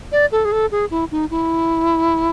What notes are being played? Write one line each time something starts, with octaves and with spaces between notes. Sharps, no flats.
D5
A4
G#4
A4
G#4
E4
D#4
E4